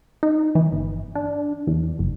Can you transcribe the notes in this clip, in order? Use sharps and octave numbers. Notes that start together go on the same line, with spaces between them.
D#4
E3
G1
D4
E2
F#1